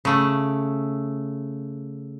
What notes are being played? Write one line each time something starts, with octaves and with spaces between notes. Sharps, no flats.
C#3 A3